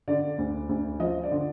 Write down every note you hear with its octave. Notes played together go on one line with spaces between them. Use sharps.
D3 D5
D2
D2
F3 D#5
D5
D3